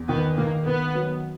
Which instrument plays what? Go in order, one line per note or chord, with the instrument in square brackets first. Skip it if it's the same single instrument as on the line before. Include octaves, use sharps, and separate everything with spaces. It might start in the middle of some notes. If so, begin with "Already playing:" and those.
Already playing: [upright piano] E2
[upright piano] D#3 [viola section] B3
[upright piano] D#3 [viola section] A#3
[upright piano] D#3 [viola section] B3
[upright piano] F#3